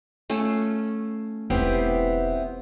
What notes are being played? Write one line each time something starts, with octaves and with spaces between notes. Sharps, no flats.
A3 C#4 F4
E1 E3 B3 C4 E4 G4